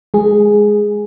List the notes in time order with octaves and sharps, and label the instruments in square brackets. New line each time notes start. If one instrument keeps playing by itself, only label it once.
[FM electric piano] G#3 G#4